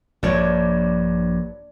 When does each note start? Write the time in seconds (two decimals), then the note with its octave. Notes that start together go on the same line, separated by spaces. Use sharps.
0.23 A#1 G2 D4 C#5